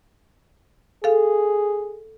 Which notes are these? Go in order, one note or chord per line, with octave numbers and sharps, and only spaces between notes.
G#4 A4 F5